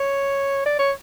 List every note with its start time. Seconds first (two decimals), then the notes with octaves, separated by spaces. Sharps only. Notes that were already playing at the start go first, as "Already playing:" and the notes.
Already playing: C#5
0.66 D5
0.79 C#5